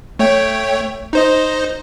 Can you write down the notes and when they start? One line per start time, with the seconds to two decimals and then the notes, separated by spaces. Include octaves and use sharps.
0.19 A3 C#5 G5
1.13 D#4 C5 D#5